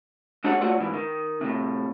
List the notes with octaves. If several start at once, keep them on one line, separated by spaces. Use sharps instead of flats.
G#3 D4 F#4 G#4 C#5 F#5
A3 F4 F#4 C#5 D5 F#5
G#2 E3
D#3
A2 C3